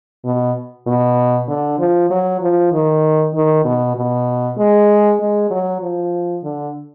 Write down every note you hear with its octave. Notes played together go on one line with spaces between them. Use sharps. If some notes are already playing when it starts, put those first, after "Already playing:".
B2
B2
D3
F3
F#3
F3
D#3
D#3
B2
B2
G#3
G#3
F#3
F3
D3